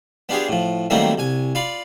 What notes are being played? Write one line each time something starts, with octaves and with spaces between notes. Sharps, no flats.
B3 D4 F4 G4 G#4
A2 F3
D#3 F#3 G3 A3 A#3 C4
C2 G#5
F4 D5 F5 B5